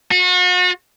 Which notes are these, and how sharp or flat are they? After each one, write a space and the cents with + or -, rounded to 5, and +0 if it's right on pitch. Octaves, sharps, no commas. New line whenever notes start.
F#4 -40